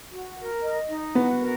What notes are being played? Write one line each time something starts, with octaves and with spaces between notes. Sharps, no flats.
F#4
A#4
D#5
D#4
B3 F#4
A#4